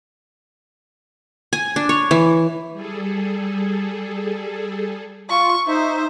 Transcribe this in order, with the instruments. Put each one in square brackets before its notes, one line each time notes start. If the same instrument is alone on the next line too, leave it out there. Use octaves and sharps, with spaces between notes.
[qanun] G#5
D4
C#5
E3
[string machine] G3 G#4 A4
[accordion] F4 [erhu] C#6
[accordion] D#4 E5 [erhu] C5